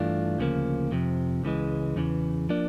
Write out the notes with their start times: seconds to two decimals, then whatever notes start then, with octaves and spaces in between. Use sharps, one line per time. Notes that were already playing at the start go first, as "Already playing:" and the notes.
Already playing: G2 E3 A3 D4 F4
0.39 D2 C#3 F3 A#3
0.91 F2 C3 F3
1.43 C#2 C#3 E3 G#3
1.96 E2 C#3 E3
2.49 F3 A#3 D4